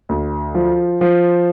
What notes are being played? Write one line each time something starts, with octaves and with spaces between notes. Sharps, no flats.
D2
F3
F3